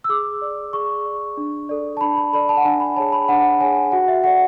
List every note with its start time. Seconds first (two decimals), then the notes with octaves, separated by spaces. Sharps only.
0.04 E6
0.09 G#4 D6
0.42 D5
0.73 G#4 C#6
1.05 D5
1.37 D4
1.69 A4 D5
1.97 A5
2.01 D4 B5
2.17 B5
2.33 A4 D5 B5
2.49 A5
2.57 F#5
2.65 D4 G#5
2.80 B5
2.96 G#4 C#5 A5
3.12 B5
3.29 D4 F#5
3.60 G#4 C#5 G#5
3.92 F#4 F#5
4.08 E5
4.24 A4 D5 F#5